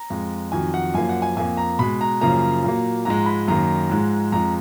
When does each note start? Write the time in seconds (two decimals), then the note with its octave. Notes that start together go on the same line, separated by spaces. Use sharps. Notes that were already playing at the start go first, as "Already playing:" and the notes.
Already playing: A#5
0.10 F2 F3 G#3
0.52 F2 D#3 F#3 G#5
0.74 F#5
0.94 F#2 F3 A#3 G#5
1.09 F#5
1.22 G#5
1.37 F2 F3 A#3 G#5
1.57 A#5
1.79 B2 G#3 B5
2.01 A#5
2.21 F#2 C#3 F3 A#3 A#5
2.64 A#2 F#3 A#3
3.05 G#2 F3 G#3 A#5
3.26 B5
3.48 F#2 D#3 A#3 A#5
3.90 G#2 F3 G#3
4.32 F2 F3 G#3 A#5